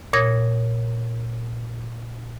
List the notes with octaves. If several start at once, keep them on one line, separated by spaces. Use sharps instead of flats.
A#2 C#5 D#6 G#6 A#6